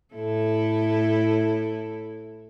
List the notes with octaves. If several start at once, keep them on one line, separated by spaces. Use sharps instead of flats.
A2 E4 A4